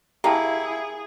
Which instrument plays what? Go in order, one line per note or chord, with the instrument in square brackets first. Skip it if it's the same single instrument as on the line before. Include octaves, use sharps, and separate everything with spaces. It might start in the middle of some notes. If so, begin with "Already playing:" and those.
[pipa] A#3 [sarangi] E4 [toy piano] G4 G5 A5 [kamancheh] G#4